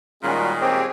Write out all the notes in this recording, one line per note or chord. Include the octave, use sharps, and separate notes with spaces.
A#2 D#3 G3 G#3 C#4 F4 F#4 A#4
C4 G4 G#4 C#5 D6